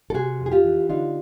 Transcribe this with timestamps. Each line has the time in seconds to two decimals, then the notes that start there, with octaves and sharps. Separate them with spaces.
0.10 A4
0.14 C3 F#4 G#4
0.40 F2
0.46 G#4
0.52 F4 G4
0.64 E3
0.89 D3 D#4 F4